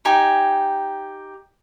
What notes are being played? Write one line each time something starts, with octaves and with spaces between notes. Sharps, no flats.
D#4 G4 G#5